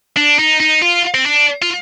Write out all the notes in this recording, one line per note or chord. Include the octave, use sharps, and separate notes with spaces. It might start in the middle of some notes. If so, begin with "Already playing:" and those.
D4
D#4
D#4
F4
C4
D4
F4